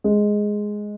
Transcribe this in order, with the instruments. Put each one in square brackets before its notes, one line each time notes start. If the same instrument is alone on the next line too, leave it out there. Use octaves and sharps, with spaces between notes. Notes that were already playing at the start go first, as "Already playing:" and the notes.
[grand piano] G#3